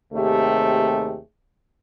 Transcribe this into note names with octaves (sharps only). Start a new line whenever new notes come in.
D#2 C3 A3 G4 G#4